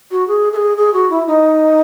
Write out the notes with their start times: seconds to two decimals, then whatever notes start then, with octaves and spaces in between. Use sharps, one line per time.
0.11 F#4
0.28 G#4
0.53 A4
0.56 G#4
0.77 G#4
0.94 F#4
1.10 E4
1.27 D#4